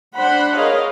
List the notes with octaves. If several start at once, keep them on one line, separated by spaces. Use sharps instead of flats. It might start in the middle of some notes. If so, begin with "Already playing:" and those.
D4 C5 F#5 B5
G#4 A#4 C#5 D#5 F5